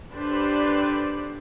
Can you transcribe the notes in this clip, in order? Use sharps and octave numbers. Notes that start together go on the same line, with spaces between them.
D4 G4 A4 B4 C5 D5